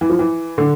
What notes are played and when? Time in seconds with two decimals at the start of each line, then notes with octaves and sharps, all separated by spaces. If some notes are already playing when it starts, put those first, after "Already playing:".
0.01 E3
0.10 F3
0.19 E3
0.58 D3